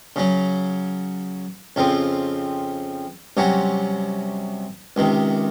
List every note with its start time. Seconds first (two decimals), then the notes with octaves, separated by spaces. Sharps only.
0.16 C#3 F#3 C#4
1.76 F2 C#3 F3 C4
3.37 C2 C3 F#3 C#4 F#4
4.96 C#2 C3 D#3